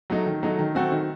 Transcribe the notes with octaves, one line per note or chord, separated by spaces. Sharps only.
F#3 A3 D#4
D#3
F#3 A3 D#4
D#3
A3 C4 F#4 A4
D#3